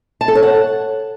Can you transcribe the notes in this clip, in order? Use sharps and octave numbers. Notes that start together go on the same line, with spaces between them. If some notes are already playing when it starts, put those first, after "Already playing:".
A5
A4
C#5
F#5